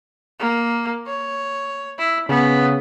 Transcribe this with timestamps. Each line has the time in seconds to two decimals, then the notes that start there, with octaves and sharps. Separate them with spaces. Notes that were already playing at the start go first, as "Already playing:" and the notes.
0.40 A#3
1.07 C#5
1.98 E4
2.29 C#3 B3